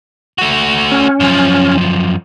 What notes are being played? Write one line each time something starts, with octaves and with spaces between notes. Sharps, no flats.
A3 F#4
C#4
F#2 F3